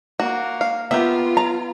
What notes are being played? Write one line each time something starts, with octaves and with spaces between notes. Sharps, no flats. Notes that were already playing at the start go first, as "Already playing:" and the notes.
A#3 F#4
F5
B3 F4 G4 A#4 E5
A#5